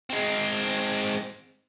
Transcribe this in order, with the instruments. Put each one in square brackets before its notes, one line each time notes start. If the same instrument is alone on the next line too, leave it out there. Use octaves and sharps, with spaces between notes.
[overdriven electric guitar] G#3 C4